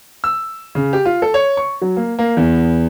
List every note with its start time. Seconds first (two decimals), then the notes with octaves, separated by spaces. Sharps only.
0.24 E6
0.75 C#3
0.93 G4
1.05 F4
1.22 A4
1.34 C#5
1.57 C#6
1.81 F#3
1.97 A#3
2.19 A#3
2.37 E2